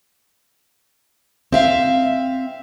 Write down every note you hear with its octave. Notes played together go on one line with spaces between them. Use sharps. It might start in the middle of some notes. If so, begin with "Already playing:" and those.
C4 E5 F5